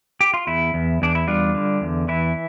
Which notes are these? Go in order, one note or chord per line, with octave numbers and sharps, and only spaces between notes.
G4
F4
E2 E4
E2
E2 D4
E4
G3 D4 F4
D3
E2
E3 E4